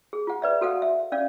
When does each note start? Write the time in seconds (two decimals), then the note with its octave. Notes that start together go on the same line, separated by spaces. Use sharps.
0.13 G#4
0.27 F4 F#5
0.42 B4 D5 E5
0.61 F#4 A4 F5 F#5
0.82 E5
1.12 C#4 D5 F5